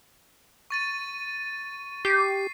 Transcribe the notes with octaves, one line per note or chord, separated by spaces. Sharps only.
C#6 A6 D#7
G4 C7